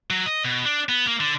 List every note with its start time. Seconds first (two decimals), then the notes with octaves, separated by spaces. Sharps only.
0.10 F#3
0.26 D#5
0.44 B2
0.65 D4
0.89 B3
1.07 A#3
1.20 D3